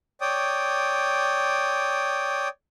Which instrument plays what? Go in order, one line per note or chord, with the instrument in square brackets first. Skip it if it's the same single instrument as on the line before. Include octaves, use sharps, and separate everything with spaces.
[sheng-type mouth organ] C#5 D5 G5 D#6